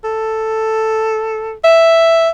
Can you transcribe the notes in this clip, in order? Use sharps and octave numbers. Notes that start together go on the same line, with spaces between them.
A4
E5